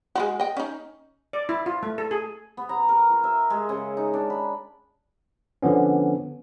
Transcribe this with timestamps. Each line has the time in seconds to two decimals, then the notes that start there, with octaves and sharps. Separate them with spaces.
0.15 G#3 F4 F#4
0.40 D#5 G5
0.57 C#4 D#4
1.33 D5
1.49 E4
1.66 F4
1.83 A3
1.98 A4
2.11 G#4
2.57 B3
2.69 A#5
2.89 A#4
3.10 F4
3.24 E5
3.50 G#3
3.69 C#3
3.97 D#4
4.14 D4
4.30 B5
5.62 D3 F3 B3 C#4